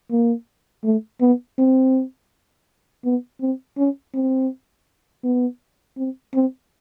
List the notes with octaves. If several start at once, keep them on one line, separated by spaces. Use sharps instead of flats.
A#3
A3
B3
C4
B3
C4
C#4
C4
B3
C4
C4